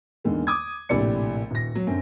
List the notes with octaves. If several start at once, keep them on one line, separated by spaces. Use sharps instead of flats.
E2 D3 D#3 G#3 A#3
D6 D#6 G#6
A#1 A2 C3 D5 C#7
D#1 A#6
F#3
F#2 D3 C4